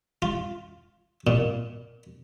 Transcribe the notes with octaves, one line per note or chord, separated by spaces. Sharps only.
F4
A#2